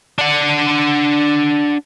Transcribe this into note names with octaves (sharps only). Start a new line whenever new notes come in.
D4 F#5